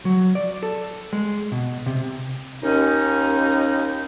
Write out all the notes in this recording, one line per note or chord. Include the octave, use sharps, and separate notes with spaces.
F#3
D5
A4
G#3
B2
C3
D#2 C#4 D#4